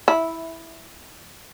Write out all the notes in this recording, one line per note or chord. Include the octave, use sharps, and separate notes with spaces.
E4